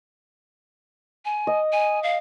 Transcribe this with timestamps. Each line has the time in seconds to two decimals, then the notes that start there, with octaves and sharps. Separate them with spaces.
1.25 G#5
1.47 D#5
1.72 G#5
2.03 F5